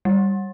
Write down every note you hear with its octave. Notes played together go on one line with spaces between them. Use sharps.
G3